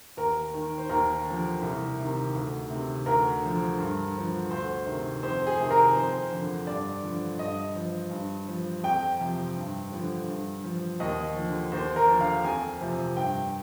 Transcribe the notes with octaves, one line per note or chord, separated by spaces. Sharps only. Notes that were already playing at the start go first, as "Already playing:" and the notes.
D#2 A#4
D#3
C5
D#2 A#4
D3 F3
C2
C3 D#3
D2
C3 D#3
D2 A#4
D3 F3
G2
D3 F3
D2 C5
C3 D#3
F2 C5
G#4
C3 D#3
A#4
F2 C5
D3 F3
G2 D5
D3 F3
G2 D#5
F3
G2
F3
F2 G5
C3 F3
G2
D3 F3
G2
F3
D#2 D#5
D3 F3
D#2 C5
A#4
D3 F3
F5
F2 G#5
C3 F3
G2 G5